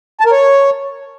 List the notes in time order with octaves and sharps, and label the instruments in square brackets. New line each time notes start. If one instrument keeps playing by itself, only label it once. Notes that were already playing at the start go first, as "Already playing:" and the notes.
[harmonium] A5
A#4
C#5